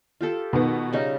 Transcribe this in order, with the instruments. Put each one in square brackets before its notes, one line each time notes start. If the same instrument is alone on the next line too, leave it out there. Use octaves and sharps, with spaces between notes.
[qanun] F4 G4 A4
[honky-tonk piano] B2 D#3 B3
[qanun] C#3 G3 D#4